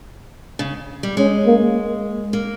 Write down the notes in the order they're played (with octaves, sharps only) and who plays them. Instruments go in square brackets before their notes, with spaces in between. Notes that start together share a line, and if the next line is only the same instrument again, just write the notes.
[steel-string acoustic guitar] C#3
G3
[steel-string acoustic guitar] G#3 [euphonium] C#4
[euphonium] A#3
[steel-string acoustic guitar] A#3